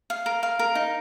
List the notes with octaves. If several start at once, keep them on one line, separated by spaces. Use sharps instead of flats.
F5
A#4
F5
A#4
D#4